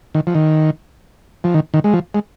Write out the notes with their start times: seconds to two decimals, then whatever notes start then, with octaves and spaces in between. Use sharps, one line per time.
0.15 D#3
0.27 F3
0.35 D#3
1.44 F3
1.54 D#3
1.74 D#3
1.84 G#3
1.93 F3
2.14 G#3